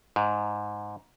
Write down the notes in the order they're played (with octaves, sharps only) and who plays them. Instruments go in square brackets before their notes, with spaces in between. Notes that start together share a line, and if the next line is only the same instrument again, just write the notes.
[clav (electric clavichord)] G#2